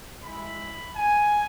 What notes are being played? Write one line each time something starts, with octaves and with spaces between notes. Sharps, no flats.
G#3 E4 B5
G#5